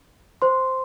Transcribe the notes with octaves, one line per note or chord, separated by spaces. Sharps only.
C5 C6